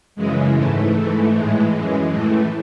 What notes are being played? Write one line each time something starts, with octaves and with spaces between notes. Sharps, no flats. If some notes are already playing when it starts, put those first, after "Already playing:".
F#2 C#3 E3 G#3
G#2 E3 A3
G#2 E3
A2 E3 G#3
F#2 E3
A2 E3 A3